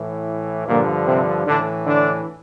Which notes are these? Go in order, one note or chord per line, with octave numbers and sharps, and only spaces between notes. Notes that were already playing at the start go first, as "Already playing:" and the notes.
Already playing: A2 E3
G2 A#2 D3 F3 A#3
C3 C4
A2 D3 E3 D4
D3 D4